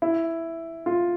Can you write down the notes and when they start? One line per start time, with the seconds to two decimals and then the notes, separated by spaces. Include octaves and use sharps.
0.02 E4
0.86 F4